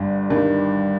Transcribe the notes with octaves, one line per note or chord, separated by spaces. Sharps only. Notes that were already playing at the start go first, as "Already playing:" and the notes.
Already playing: G1 G2
G1 G2 D#3 G3